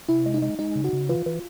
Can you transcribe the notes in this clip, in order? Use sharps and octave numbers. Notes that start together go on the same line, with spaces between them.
C3 E4
G#3
D#4
G#3
G#3 D#4
C#3
F#4
C#3
E3 F4
E3